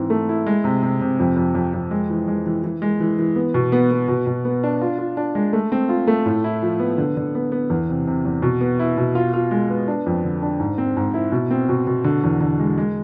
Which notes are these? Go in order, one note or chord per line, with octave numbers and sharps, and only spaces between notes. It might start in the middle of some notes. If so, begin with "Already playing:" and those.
Already playing: G#2 E3 C4
A3
E4
G#3
C3
C3
C3
F2
F2
F2
F2
G#3
E3
G#3
E3
E3
G#3
E3
E3
B3
B2
B3
B3
B2
B2
B3
D4
F4
F4
D4
G#3
A3
C4
F4
A3
A2
E4
F3
B3
D3
D3
B3
B3
E2
C3
C3
E2
B2
B3
E4
B2
F4
F4
G#3
B3
D4
F2
D3
D4
G#2
C4
G#2
E4
B2
C4
B2
B2
D3
E2
D3
G#3
G#3